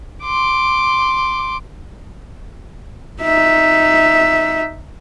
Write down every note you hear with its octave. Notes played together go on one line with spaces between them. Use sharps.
C6 D6
D#4 E5